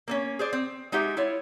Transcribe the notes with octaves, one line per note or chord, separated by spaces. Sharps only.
A#3 C4 C#4
G#4 C5 D5
C4
G#3 D#4 F#4 G4 E5
E4 F4 C#5